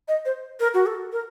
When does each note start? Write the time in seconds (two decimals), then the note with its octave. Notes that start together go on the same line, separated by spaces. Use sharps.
0.08 D#5
0.26 C5
0.60 A#4
0.74 F#4
0.86 A4
1.13 A#4